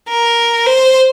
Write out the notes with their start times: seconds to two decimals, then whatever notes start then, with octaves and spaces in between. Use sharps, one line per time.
0.09 A#4
0.66 C5